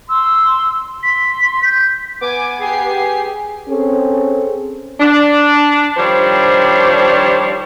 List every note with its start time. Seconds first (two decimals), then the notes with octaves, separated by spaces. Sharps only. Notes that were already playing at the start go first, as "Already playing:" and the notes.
0.09 C6 E6
1.03 C6 B6
1.63 G6
2.22 B3 G#5 D6
2.61 G4 G#4 G#5 C7
3.69 C4 C#4 G#4 A4
5.00 D4
5.97 D#3 F3 G3 D4 C5 C#5